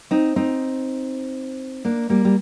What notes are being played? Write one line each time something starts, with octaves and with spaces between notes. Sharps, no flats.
C4 D#4
C4 D#4
A#3 D4
G3 A#3
G3